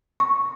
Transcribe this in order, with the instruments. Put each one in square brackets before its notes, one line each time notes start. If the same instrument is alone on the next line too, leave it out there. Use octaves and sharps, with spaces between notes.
[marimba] C#6